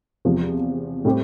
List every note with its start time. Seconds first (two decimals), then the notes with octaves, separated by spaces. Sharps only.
0.25 E2 C3 F3
1.05 A2 G3 C4 G4